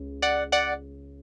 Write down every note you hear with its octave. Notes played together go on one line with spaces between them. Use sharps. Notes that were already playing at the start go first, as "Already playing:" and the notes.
Already playing: C#2 C#3
D5 F#5
D5 F#5